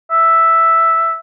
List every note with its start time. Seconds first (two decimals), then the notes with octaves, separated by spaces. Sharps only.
0.11 E5